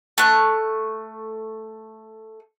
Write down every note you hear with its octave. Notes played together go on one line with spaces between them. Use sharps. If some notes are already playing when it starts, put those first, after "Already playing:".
A3 F#6